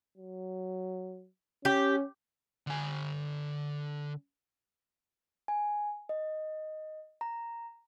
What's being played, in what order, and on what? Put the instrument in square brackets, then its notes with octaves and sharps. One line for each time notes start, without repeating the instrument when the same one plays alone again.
[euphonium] F#3
[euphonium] C#4 [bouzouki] G4
[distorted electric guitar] D3 G#5
[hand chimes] G#5
D#5
A#5